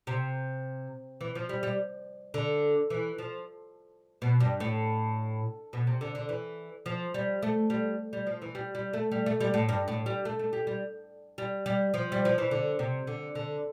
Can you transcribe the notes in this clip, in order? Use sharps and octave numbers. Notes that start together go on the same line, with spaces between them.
C3
E3
F3
G3
G3
D3
E3
F3
B2
G2
A2
B2
C3
D3
D3
E3
F3
G3
A3
G3
G3
F3
E3
G3
G3
A3
G3
A3
G3
A2
G2
A2
G3
A3
A3
G3
G3
G3
G3
F3
G3
F3
E3
D3
C3
D3
D3